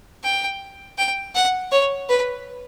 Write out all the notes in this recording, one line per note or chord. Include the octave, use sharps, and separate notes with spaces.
G5
G5
F#5
C#5
B4